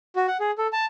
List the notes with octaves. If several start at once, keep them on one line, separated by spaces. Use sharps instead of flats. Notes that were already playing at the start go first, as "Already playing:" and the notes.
F#4
F#5
G#4
A4
A5